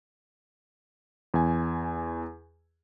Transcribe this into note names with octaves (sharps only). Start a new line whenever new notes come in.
E2 G#5